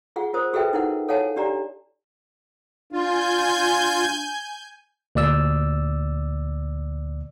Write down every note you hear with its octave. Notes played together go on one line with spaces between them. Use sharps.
F4 G#4 F#5
F4 A#4 C5 D#6
F#4 G#4 A4 B4 E5 G5
D#4 E4 A#4 F#5
A4 C#5 F5 F#5 G#5 A5
D4 G4 D5 A#5
D4 F4 G#5 G6
D2 A#2 D5 E6